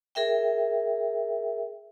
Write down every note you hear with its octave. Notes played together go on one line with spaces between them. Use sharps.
G#4 A#4 E5 G5